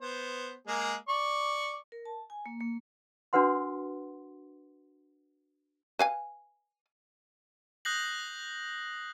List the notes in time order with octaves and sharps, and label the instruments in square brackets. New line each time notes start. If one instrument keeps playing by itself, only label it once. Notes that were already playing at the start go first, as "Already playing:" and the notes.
[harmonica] B3 C5
G#3 A#3 G#4
D5 C#6
[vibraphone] A#4
A5
G#5
A#3
A#3
[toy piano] D4 F#4 A#4 B4 F#5 C6
[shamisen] B4 F5 G#5
[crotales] D#6 F#6 G6 A#6 C7 F#7